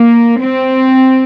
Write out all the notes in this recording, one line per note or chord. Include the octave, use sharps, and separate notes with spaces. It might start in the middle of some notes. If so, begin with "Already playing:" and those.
Already playing: A#3
C4